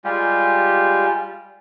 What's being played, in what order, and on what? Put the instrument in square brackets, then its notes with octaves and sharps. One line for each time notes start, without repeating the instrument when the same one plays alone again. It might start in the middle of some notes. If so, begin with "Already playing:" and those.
[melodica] G3 G#3 F4 G4